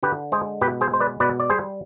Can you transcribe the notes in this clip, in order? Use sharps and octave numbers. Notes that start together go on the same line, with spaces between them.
D3 G4 B4
G#3 G#4 C5
B2 G4 B4
G#4 C5
G#3 C5
B4 D5
B2 B4 D5
D5
G3 G#4 C5